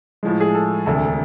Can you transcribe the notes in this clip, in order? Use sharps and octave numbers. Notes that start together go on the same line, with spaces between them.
A2 F3 G#3
G#4
A4
E1 D2 C3 A4